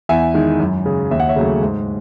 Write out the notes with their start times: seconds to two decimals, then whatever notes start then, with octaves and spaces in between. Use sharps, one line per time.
0.09 E2 E5 G#5
0.34 D#3 G#3
0.60 F#2
0.85 C#3 G#3
1.11 D#2 E5
1.20 F#5
1.29 C#5 E5
1.36 C#3 F#3 A3
1.62 G#2